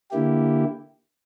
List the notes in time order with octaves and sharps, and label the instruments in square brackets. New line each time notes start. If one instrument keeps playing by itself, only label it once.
[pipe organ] D3 A#3 E4 G4